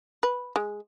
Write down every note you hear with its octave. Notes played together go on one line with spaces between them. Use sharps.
B4
G#3